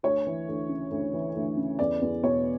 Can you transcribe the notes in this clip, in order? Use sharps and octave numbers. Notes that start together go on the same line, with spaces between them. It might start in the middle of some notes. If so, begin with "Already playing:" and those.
D2 C#5
E3
D2
C#3
D2
E3
D2
C#3
E2 D5
E2
B2 C#5